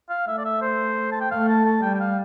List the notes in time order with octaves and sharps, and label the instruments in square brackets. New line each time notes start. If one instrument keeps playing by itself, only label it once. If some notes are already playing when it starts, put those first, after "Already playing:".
[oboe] F5
[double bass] A3 [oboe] E5
[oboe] D5
E5
C5
A5
G5
[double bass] A3 [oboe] F5
[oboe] A5
A5
[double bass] G3 [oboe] G5
[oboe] G5
F5